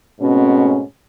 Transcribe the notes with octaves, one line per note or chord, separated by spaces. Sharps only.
G#2 B2 A3 C4 C#4